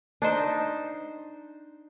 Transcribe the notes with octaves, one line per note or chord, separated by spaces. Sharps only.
D4 D#4 C5